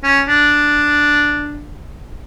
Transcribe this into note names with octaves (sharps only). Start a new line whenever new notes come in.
C#4
D4